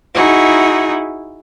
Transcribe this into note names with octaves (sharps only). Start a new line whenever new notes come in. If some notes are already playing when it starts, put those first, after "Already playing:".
D#4 E4 F#4 G#4